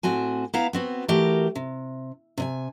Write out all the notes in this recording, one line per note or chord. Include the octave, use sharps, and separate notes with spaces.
A2 C4 F#4 G#5
B3 E4 E5 F5 A#5
B3 C4 F#4
E3 A3 F#4 G4 A#4
C3
C3 D#5 G#5